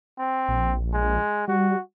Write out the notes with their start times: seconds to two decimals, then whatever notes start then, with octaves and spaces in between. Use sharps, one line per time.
0.19 C4
0.48 A#1
0.93 G#3
1.48 G3 F#4